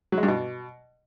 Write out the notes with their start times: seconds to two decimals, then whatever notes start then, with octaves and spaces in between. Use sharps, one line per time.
0.12 F#3
0.18 G#3
0.23 G2
0.28 B2